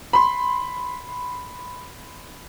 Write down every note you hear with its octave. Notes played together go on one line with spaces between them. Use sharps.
B5 C6